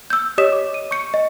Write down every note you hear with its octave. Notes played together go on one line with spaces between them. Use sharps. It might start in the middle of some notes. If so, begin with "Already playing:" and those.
E6 G6
G4 C#5 D#5 D#6 B6 E7
D6
D#7
C#6 G6 C#7
D#5